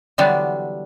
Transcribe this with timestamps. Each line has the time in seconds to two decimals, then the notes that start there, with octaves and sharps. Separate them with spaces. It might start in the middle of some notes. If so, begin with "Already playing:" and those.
0.18 D3 E3 F#3 G3 B3 D4